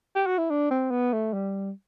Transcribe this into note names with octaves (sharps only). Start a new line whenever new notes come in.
G4
F#4
E4
D4
C4
B3
A3
G3